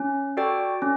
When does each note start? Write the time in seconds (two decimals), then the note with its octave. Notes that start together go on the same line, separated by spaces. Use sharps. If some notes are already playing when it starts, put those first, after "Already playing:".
Already playing: C#4
0.37 F#4 A4 D5 G5
0.82 C#4